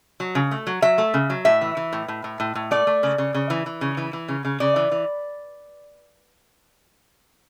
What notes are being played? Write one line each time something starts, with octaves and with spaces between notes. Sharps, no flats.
F#3
C#3
A3
F#3
F#3 E5
A3
C#3
F#3
A2 E5
E3
E3
A2
A2
A2
A2
A2
A3 D5
A3
C#3
C#3
C#3
E3
E3
C#3
E3
E3
C#3
C#3
C#3 D5
E3
E3